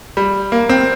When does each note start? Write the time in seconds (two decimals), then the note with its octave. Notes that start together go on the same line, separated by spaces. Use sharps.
0.17 G3
0.52 A#3
0.69 C4